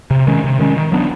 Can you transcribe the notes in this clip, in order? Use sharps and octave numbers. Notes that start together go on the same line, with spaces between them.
C3
D#3 G#3 C#4
C3
D#3 G#3 C#4
D#3
F#3 B3 D4